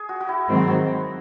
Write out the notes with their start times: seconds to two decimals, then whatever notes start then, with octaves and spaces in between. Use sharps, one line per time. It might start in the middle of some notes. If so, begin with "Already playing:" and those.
Already playing: G#4
0.09 F#4
0.20 F#4
0.29 E4
0.49 G#2 D#3 F#3 C4